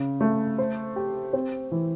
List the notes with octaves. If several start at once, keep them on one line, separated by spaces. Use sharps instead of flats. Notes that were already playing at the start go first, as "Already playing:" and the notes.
Already playing: C#3
A3
C5
G4
C4
E3